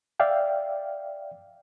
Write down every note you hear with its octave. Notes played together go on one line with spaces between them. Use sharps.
D5 E5 F5 G5